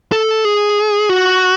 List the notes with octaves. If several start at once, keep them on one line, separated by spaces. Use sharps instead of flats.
A4
G#4
F#4